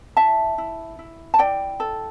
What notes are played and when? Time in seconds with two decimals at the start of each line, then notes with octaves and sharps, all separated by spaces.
0.17 E4 E5 A5
0.58 E4
0.99 E4
1.34 A5
1.39 E4 D5 G5
1.80 A4